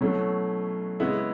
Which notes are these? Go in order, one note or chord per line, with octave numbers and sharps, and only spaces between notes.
B2 F#3 A3 C#4 E4
C#3 G#3 B3 E4